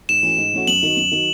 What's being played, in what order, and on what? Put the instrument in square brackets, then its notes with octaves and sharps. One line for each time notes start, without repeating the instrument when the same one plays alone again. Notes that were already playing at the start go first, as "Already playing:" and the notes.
[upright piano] G#2 [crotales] E7
[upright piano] E3 A3 C#4 F#4
G#2
E3 A3 C#4 F#4
[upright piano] F#2 [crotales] F#7
[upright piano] D#3 F#3
F#2
D#3 F#3